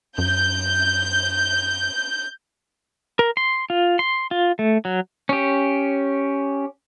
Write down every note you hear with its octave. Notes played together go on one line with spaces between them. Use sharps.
F#2 G6
A#4
C6
F4
C6
F4
A3
F#3
C#4 G4